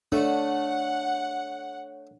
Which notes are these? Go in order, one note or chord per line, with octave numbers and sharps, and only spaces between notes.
A3 D4 C#5 F#5